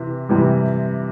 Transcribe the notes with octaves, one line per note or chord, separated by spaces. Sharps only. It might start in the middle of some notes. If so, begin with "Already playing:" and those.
Already playing: C3 E3
C3 E3 G3